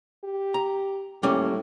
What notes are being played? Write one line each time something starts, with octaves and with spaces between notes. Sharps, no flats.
G4
A#5
A2 G3 A#3 C#4